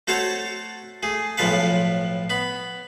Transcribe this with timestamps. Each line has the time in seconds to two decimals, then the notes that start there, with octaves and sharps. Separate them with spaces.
0.07 A3 F#4 A4 C5 C#5 A5
1.03 A3 G#4
1.37 B1 A2 F3 A4 B4 F5
2.30 B3 B5